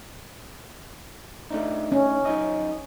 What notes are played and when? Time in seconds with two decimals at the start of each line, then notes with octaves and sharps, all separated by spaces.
1.51 A3 D4 D#4
1.92 C#4
2.25 F#2 D#4 D#5